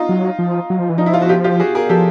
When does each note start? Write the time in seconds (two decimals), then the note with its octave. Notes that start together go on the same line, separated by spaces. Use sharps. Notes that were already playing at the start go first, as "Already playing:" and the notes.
Already playing: D#4 F4
0.09 F#3
0.39 F3
0.70 F#3
0.79 F3
0.89 E3
0.98 F3 D#4
1.06 E4
1.14 F4
1.22 F#4
1.29 F4 G4
1.44 F4 G4
1.60 F#4 G#4
1.75 G#4 A#4
1.89 F3 G4 A4